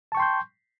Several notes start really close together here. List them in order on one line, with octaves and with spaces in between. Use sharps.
A5 C#6 G5 C6 G6